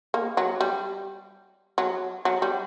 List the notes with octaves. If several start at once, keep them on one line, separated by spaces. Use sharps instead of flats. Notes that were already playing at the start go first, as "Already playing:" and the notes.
A#3
F#3
G3
F#3
F#3
G3